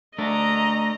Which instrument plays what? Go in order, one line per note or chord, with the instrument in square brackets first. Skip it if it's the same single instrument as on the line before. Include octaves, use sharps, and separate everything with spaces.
[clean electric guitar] A3 D4 [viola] D#5 A#5